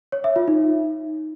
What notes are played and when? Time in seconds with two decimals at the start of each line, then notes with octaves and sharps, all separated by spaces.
0.12 C#5
0.24 E5
0.36 F4
0.48 D#4